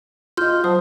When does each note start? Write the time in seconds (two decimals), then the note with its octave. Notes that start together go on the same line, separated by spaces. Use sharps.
0.37 F4 D#5 C6 F6 G6
0.64 F#3 C5 A5 D#6